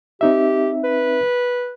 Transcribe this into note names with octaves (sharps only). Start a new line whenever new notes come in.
C4 D#4 G4 E5
B4